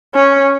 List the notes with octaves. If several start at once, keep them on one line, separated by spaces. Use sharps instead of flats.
C#4